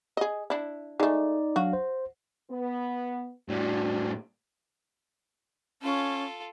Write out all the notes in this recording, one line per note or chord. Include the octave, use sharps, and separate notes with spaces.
G#4 D#5
D4 E4
G#3 A3 D#4 D5
F#3 D4 F#4 F5
C5
B3
A2 G3 D4 F#4
C#4 F4 A4